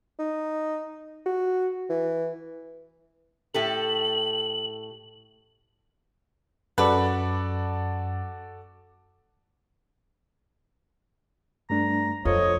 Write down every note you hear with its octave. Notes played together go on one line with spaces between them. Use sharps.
D#4
F#4
E3
A2 G4 A4 F#7
F#2 F#4 A4 B4 D5
G2 A3 D4 A#5
F2 F4 A4 C5 C#5 D#5